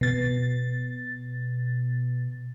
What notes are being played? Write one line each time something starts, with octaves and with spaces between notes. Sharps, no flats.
B2 A6